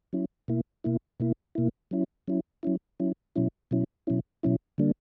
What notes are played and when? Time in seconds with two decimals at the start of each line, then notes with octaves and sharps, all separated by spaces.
0.13 F#3 C#4 E4
0.48 B2 A#3 E4
0.84 B2 A#3 E4
1.20 B2 A#3 E4
1.55 B2 A#3 E4
1.91 F#3 C#4 E4
2.28 F#3 C#4 E4
2.63 F#3 C#4 E4
3.00 F#3 C#4 E4
3.36 B2 F#3 C#4 E4
3.71 B2 F#3 C#4 E4
4.07 B2 F#3 C#4 E4
4.43 B2 F#3 C#4 E4
4.78 D3 G3 A#3 D4